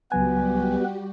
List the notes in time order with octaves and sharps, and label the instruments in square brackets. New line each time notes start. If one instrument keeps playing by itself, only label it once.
[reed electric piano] C#2 F#3 G#5 [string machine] G3 F#4 G4 [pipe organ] B3 B4